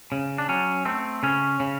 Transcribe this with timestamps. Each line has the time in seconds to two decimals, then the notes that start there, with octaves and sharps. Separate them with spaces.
0.12 C#3
0.38 D4
0.49 F#3 C#4
0.85 A3 C4
1.23 C#3 C#4
1.60 C#3